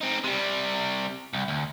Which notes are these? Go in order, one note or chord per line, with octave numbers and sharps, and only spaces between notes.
C4 D#4
C3 G3
C2
D2